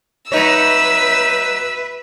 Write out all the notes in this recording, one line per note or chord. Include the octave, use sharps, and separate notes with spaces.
F#3 D#4 B4 C#5 E5 E6